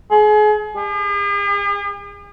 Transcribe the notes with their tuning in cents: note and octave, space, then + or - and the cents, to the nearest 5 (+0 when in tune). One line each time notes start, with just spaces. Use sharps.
G#4 +35
G#4 -45